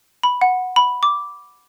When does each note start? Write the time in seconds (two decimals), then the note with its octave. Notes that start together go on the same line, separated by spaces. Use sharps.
0.23 B5
0.41 F#5
0.76 B5
1.03 D6